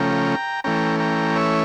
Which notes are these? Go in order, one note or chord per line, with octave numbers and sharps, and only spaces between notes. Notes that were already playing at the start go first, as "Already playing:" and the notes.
Already playing: C#3 F3 A3 C#4 G5 A#5
E3 A3 C#4 G5 A#5
G5 A#5
C#5 E5